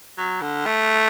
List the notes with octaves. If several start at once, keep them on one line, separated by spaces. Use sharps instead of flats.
F#3
D3
A3